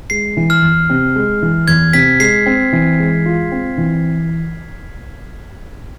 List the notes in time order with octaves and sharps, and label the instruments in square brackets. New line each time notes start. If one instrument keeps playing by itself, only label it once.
[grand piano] G#3 [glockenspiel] C7
[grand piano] E3
[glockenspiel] F6
[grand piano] E2
C3
G#3
E3
[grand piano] E2 [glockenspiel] G#6
[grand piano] C3 [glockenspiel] B6
[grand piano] G#3 [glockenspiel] C7
[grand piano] C4
E3
G#3
F4
C4
E3